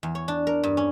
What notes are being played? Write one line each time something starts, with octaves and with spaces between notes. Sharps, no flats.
E2
C#5
D4
A#4
G2
C#4